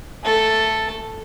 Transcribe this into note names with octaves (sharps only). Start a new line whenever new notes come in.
A3 A4